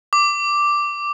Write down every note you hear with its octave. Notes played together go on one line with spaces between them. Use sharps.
D6